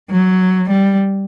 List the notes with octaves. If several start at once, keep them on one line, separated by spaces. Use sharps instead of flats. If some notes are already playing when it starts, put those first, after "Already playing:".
F#3
G3